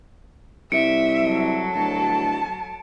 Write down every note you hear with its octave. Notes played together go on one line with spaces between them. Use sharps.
C2 E5 C#7 D7
F#3 A4
D1 A5